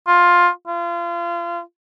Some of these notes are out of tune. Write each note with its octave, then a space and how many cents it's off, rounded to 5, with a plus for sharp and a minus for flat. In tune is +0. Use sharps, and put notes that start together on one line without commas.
F4 +10
F4 -30